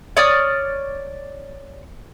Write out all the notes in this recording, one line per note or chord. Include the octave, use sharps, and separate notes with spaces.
C#5 D5 D#6 F6